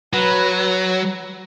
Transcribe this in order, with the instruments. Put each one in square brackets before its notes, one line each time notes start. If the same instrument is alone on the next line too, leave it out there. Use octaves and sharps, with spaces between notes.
[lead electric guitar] F#3 [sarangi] B4